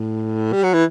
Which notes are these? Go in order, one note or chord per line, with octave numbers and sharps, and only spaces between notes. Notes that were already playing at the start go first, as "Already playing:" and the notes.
Already playing: A2
G3
F#3
E3